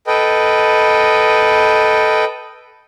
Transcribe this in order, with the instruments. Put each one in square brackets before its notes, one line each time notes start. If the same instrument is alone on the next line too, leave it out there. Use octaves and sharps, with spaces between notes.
[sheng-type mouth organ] A4 B4 D#5 G5